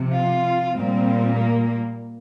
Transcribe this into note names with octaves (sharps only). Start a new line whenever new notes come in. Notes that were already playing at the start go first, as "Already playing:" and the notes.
Already playing: C3 F3
F4
A#2 G3 C4
A#3